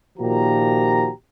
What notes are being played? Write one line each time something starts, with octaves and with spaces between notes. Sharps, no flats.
A#2 D#3 F3 F#4 G4 A#5